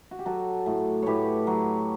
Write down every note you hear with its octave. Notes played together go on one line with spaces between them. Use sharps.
F#4
G4
F#3 F#4 A4
A2
A2 G4 B4 C#5
F#3